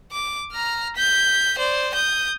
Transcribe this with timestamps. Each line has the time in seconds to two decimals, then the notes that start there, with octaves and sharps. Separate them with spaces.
0.12 D6
0.52 A#5 F6
0.96 G6 B6
1.58 C5 D5
1.94 D#6 G6